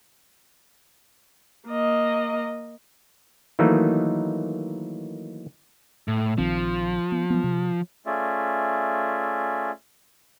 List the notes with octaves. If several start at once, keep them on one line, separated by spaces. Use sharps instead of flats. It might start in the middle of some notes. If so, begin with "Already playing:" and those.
A#3 D#5
D#3 E3 F#3 A3 A#3 D#4
A2
A#1 D#3 F3 C4
B3
F#3 B3
C3
A3 C#4 F4 G#4 D5 E5